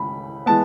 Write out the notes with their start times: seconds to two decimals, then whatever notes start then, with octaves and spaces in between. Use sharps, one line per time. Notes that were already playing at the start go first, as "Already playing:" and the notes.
Already playing: C#2 C#3 B5
0.46 E3 G#3 B3 A5